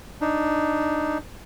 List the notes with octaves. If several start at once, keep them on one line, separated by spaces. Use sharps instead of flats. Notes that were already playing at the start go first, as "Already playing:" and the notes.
D4 D#4